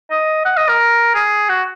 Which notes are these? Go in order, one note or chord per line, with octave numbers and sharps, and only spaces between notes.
D#5
F#5
D#5
A#4
G#4
F#4